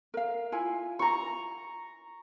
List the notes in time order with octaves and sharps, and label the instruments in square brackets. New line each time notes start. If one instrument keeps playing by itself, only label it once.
[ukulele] A#4 F5
E4 F4 G#5
[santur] A#5 C#6